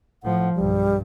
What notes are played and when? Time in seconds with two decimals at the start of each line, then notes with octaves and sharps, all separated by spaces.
0.23 A2 F3 F#5
0.55 B1 G2 G3